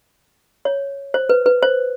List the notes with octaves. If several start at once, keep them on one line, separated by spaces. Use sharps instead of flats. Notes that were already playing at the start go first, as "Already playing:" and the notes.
C#5
C5
B4
B4
C5